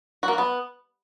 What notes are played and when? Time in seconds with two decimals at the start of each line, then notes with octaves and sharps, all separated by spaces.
0.23 F#4
0.28 A#3
0.33 F#4
0.38 B3